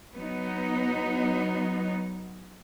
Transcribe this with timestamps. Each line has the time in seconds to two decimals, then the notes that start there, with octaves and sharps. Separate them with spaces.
0.14 F#3 B3 D#4